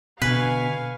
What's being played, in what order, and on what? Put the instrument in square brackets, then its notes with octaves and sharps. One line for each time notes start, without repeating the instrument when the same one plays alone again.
[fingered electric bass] B2 D3 [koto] B4 [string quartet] F5 G#5 C#6